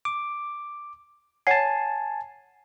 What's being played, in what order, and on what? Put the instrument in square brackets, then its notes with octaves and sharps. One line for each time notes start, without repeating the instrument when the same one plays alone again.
[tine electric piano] D6
[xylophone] C#5 F#5 C7 [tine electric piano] G#5 A5